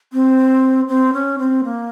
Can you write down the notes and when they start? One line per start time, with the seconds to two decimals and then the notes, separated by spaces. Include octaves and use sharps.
0.13 C4
0.88 C4
1.13 C#4
1.39 C4
1.64 A#3